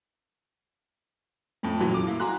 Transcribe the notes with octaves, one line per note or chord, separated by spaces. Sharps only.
F2 A2
F#2 A#2 E3 F#3
D6
A#3 E4
F#4 G#5 A#5 C6 F#6